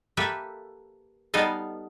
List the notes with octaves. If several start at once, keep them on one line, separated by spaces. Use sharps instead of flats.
A#3 G4 A4 B4 E5
G3 B3 D#4 A4 D#5 F5